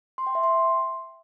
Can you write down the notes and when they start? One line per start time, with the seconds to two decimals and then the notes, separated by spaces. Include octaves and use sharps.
0.18 C6
0.27 G5
0.35 E5
0.44 C6